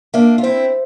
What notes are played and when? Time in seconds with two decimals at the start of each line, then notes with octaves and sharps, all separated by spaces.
0.14 A#3 D4 E5
0.38 F4
0.43 C4 E4 C5